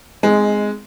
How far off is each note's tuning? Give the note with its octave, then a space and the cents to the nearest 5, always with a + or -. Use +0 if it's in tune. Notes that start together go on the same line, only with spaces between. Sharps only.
G#3 +0 C4 -20 D#4 +20